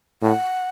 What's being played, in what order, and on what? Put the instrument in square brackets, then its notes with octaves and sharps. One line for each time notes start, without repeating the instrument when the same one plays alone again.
[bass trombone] A2 [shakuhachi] F#5